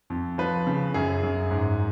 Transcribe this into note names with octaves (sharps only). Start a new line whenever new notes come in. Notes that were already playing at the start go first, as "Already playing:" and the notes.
F2
F3 B4
C#3
F#2 G#4
F#2
G#2